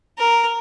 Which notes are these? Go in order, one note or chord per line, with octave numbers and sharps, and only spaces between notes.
A#4